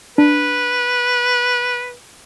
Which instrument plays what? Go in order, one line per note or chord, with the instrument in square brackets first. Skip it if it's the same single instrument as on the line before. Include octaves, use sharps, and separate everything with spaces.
[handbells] D4 [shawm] B4